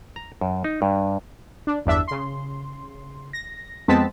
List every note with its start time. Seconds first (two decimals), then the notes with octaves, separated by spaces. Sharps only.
0.16 A#5
0.41 F#2
0.64 D#4
0.82 G2
1.67 D4
1.86 G1 E2 D4 E5
2.08 C#3 C6
3.33 A#6
3.88 F2 G#3 B3 C4 A5 B6